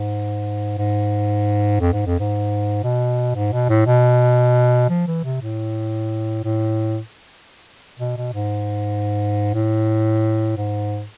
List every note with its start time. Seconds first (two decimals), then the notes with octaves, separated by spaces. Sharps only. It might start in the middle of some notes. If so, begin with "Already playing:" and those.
Already playing: G#2
0.78 G#2
1.80 F2
1.93 G#2
2.07 F2
2.20 G#2
2.84 B2
3.35 G#2
3.53 B2
3.69 A2
3.87 B2
4.90 F3
5.07 E3
5.24 C3
5.42 A2
6.44 A2
8.00 B2
8.17 B2
8.33 G#2
9.54 A2
10.57 G#2